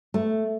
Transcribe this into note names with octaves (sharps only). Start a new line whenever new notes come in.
A3